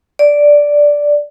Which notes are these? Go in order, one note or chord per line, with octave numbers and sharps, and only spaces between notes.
D5